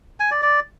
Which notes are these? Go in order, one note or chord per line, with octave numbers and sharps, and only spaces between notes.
G#5
D5
D5